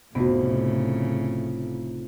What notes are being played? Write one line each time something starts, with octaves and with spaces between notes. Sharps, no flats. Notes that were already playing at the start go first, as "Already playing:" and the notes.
F1 A2 C#3 B3 F#4